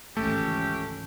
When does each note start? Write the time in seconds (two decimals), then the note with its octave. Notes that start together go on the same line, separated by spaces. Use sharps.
0.17 G#1 C#2 E3 A3 C#4 G4 A4